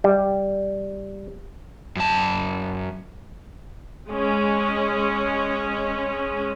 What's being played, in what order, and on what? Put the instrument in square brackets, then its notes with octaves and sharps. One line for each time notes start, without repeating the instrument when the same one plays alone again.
[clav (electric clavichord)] G3
[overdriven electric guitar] F#2 A5
[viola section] G#3 C#4